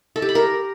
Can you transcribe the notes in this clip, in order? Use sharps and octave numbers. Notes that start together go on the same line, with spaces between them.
A4
G4
B5
A#4